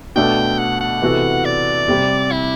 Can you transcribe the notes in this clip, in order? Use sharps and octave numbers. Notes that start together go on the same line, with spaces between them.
B2 A3 D4 A4 G5
F#5
F#5
C3 E3 B3 F#4 A4
D5
C3 G3 C4 G4
E4